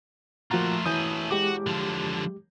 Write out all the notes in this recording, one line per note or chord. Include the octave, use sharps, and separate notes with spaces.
A#2 F3 A3 F4 F#4 A#5
E1 E3 A3 G#5 D#6 G6
G#3 F#4 G4 D6
D3 F3